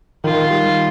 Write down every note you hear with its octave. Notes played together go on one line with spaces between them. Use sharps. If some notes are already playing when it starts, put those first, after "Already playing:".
D#3 F4
G3